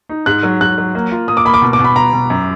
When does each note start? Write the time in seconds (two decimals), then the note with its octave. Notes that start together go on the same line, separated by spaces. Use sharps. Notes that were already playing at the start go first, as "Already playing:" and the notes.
0.09 D#4
0.26 G#2 F#6
0.43 F#3
0.60 G#2 F#6
0.78 F#3
0.95 A#3
1.12 F4
1.28 A#3 D#6
1.37 D6
1.45 A#3 B5
1.54 D6
1.62 B2
1.73 D6
1.79 B2
1.84 B5
1.96 B2 A#5
2.13 B2
2.30 F#2